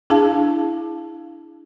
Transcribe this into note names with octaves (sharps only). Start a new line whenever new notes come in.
D4 E4 G#4 F5 A5